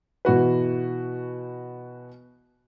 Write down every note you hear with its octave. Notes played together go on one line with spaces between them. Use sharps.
B2 E3 F#4 B4